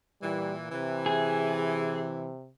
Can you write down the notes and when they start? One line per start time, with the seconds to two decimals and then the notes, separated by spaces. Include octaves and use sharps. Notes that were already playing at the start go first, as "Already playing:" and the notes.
0.22 A#2 E3 G3
0.72 C3 E3
1.06 G#4